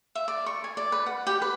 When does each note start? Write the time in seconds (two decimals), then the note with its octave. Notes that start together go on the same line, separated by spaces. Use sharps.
0.15 E5
0.28 D5
0.46 C#6
0.64 G#5
0.77 D5
0.92 B4
1.06 F#5
1.27 G4
1.42 B4